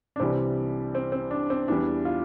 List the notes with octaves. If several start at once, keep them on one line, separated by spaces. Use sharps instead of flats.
D4
C2 C3 E3 G3 C4
C4
C4
D4
C4
E2 E3 G3 D4
F4